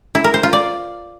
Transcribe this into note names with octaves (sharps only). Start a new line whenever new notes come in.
E4
A#4
C5
F4
D5